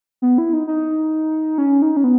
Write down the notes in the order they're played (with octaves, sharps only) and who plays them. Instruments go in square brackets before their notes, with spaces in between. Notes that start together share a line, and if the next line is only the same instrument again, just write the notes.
[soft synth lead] B3
E4
D#4
D#4
C#4
D#4
C#4
B3